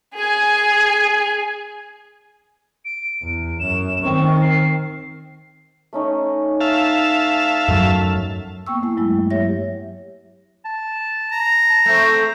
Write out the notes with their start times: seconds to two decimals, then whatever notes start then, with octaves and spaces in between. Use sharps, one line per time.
0.15 G#4 G#5
2.85 D7
3.22 E2
3.60 F#2 E7
4.02 D#3 C4 C#6
4.42 C7
5.93 A3 C#4 D#4
6.61 E5 F5 A5
7.68 F#2 F#3 A3 A4
8.67 A#3 B3 G5 C#6 E6
8.83 A3 E4 G#5
8.97 G2 F#3 G#3 E4
9.30 F#3 G4 C#5 E5 A#6
10.65 A5
11.32 A#5
11.70 A5
11.86 A3 C4 E5